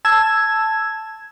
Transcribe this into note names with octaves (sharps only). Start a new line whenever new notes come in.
A5 E6 G#6